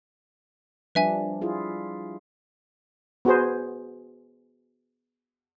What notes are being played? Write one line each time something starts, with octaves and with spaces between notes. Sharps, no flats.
F3 G3 D4 B4 E5 G#5
E4 F4 G#4
B3 F#4 G#4 C5